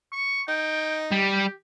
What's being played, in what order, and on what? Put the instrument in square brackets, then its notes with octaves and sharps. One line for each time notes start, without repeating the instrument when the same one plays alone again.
[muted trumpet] C#6
[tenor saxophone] D#4 [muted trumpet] G5
[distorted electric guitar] G3 [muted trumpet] G4